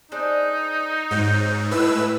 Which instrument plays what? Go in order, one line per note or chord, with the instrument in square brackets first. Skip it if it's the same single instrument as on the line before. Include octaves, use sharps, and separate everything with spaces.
[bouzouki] D4 G#4 C5 [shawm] D#4
[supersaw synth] G#2 [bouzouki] F#3 C4
[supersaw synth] A2 B4 E6 [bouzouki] G#3 F#4 [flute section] E4